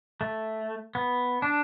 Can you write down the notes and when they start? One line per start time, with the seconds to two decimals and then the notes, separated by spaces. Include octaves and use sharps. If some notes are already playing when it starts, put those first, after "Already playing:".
0.21 A3
0.95 B3
1.42 D4